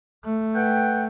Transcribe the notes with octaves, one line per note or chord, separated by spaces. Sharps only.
A3
B4 F#5 G5